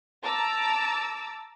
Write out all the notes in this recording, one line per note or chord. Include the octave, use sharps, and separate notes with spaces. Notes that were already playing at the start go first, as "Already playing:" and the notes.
A5 A#5 D6 E6 A6